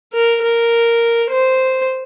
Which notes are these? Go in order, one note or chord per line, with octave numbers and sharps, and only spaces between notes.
A#4
A#4
C5